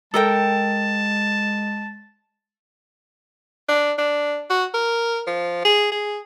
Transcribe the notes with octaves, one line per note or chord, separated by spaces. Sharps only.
G#3 A4 A#4 G5 A5
D4
D4
F#4
A#4
F3
G#4
G#4